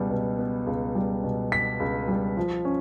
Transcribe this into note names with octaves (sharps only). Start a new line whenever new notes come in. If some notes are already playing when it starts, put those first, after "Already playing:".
Already playing: C#2 B2 G3 B3
B2
B3
C#2
G3
B2
B3 B6
C#2
G3
F3
C#4